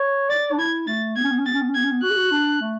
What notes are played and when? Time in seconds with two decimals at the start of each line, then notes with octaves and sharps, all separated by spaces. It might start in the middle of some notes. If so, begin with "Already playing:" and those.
Already playing: C#5
0.30 D5 A6
0.53 D4
0.59 E4 G#6
0.87 A3 A6
1.16 B3 G#6
1.24 C#4
1.31 B3
1.39 C#4
1.46 B3 A6
1.54 C#4
1.62 B3
1.69 C#4
1.75 B3 G#6
1.84 C#4
1.92 B3
2.03 F#4 F#6
2.11 G#4
2.17 F#4
2.32 D4
2.61 A3